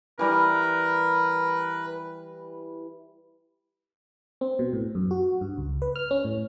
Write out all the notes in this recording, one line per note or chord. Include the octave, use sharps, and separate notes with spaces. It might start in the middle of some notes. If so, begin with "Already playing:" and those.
E3 G3 A#4 B4
C4
B2
A2
F#2
F#4
G2
C#2
B4
F6
C#4
A2